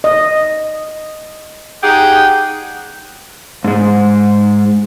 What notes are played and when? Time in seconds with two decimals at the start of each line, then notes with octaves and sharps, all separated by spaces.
0.04 D#5
1.83 D#4 G4 G#4 F#5 G5
3.64 G#2 G#3